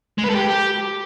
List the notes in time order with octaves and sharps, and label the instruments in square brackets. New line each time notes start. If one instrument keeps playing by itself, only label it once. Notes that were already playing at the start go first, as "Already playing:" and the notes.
[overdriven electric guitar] G#3
B4
A4
G4